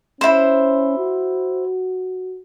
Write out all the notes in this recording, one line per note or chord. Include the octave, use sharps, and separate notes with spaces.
C#4 E4 C5
F#4